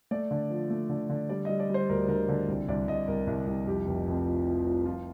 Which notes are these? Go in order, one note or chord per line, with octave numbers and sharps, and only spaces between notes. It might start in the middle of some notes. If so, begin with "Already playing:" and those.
A3 D5
D3
F3
A3
D3
D3
G3 D5
G3 D#5
D5
G3 C5
D2 A#4
D3 A#4
D3
C2
C2 D5
C2 D#5
C2 A#4
C2
C2
F2 G4
F1
F2
F3
F3
F3
F3 F4